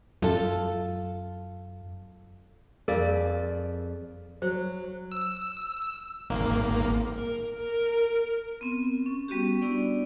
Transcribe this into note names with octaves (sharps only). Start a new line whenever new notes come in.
F#2 F4 A4
F2 G#4 A#4 D5 F5
F#3 C5
E6
G#1 A#3
A#4
A#4
B3 C4
C#4
G3 B3 C#4 F#4 G4
B3 D4 E4 D5